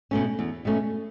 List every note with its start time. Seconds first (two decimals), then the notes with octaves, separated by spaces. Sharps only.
0.11 B2 A3 C#4
0.39 E2
0.65 B2 A3 C#4